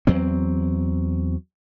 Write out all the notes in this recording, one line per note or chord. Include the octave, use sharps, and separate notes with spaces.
E2 F#3 C4